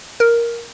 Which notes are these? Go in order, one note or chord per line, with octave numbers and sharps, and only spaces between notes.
A#4